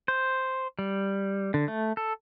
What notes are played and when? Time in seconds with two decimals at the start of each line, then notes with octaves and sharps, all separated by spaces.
0.08 C5
0.79 G3
1.54 D3
1.68 A3
1.97 A4